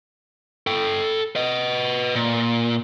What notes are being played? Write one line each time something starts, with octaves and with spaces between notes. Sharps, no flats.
A4 G5
B4 D#5
A#2